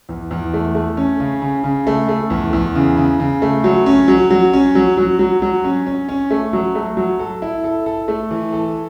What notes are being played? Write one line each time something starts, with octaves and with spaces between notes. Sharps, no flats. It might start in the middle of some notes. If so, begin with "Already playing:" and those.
E2
E2
A3
A3
C#4
C#3
C#3
C#3
A3
A3
E2
E2
C#3
C#3
C#3
A3
F#3
C#4
F#3
F#3
C#4
F#3
F#3
F#3
F#3
C#4
C#4
C#4
A3
F#3
A3
F#3
A4
E4
A4
A4
A3
E3
A4